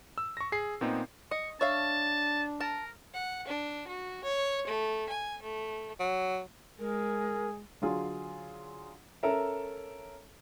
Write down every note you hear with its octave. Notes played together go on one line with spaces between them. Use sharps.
E6
C#6 A#6
G#4 C7
A#2 B3 C4 D#4
D#5 C#6
D4 C#5 E5 F5 A5
A#4 A5
F#5
D4
F#4
C#5
A3
G#5
A3
F#3
G#3 G#4 A#4
D3 F#3 F4 G#4
C#4 A4 A#4 E5